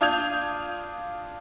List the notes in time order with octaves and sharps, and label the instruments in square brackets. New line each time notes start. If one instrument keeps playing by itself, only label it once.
[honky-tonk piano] D4 F4 D#6 G6 G#6 F7